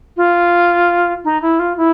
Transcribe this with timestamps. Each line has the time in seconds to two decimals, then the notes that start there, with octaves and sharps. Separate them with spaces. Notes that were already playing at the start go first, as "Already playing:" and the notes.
0.17 F4
1.24 D#4
1.42 E4
1.59 F4
1.77 E4